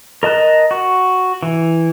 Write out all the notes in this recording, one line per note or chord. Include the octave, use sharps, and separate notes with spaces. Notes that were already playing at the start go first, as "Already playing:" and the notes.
A#4 D#5 A5 F#6
F#4
E3